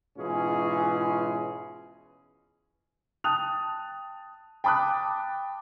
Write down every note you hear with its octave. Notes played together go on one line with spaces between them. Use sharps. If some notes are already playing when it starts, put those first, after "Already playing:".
G#2 B2 E3 C#4 F4 G#4
G5 A5 D#6 F#6 F7
G5 A5 B5 D6 D#6 F#6